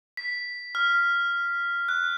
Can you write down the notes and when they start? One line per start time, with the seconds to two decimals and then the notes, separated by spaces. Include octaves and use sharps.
0.17 B6
0.75 F6
1.89 F#6